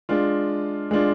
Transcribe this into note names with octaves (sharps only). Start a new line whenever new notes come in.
G#3 D4 F4
G#3 D4 F4